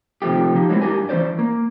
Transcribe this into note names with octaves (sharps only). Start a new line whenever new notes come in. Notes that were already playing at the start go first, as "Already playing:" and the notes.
C3 D#3 F3 A3 G4
F3 D#4 G4
F#3 G#3 A#3 C4 D#4 E4
G2 E3 D4 G4 A#4 G#5
E3 A3 C#4 C5 D5
A#3